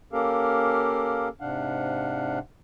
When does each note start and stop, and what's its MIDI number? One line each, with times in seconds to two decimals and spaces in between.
0.13 1.28 58
0.13 1.28 61
0.13 1.28 67
0.13 1.28 69
0.13 1.28 70
0.13 1.28 77
1.40 2.39 44
1.40 2.39 48
1.40 2.39 62
1.40 2.39 77
1.40 2.39 78